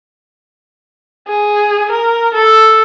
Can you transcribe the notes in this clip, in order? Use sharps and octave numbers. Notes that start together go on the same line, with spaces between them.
G#4
A#4
A4